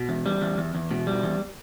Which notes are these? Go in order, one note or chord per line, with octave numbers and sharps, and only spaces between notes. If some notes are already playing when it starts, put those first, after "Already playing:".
Already playing: B2
E2
G3
E2
E2
E2
B2
G3
E2